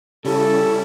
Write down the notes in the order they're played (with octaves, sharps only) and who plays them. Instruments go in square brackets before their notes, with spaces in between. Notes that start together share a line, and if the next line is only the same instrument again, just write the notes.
[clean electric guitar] C#3 [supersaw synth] G3 C#4 E4 [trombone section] A4